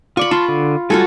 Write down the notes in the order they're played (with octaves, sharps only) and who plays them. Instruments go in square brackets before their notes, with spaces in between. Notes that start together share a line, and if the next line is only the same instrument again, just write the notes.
[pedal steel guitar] F4 D5 [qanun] B5 C#6
[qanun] F4 [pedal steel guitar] A5 C6
[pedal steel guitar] D3
[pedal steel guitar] G3 G#5 [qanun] F4 F#4 A4